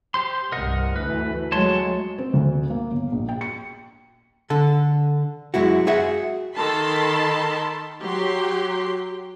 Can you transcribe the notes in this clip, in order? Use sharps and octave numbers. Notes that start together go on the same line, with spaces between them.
G4 C5 C6
C2 G2 C3 A#4 D#5 F#5
D2 E3 A3 B4
F#3 G#3 A3 C#5 A5 C6
C4
D2
A#3
G1
A#1
G5
C#7
D3 A4
F#2 G#3 E4 F#4
F#4 G#4 E5 F#5
D#3 A4 A5 B5 C6
F#3 G4 C6